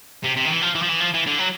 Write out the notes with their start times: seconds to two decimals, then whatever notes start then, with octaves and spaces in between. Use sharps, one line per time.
0.25 C3
0.37 C3
0.46 D#3
0.50 E3
0.62 F3
0.75 E3
0.82 F3
0.89 E3
1.00 F3
1.14 E3
1.26 D3
1.38 F#3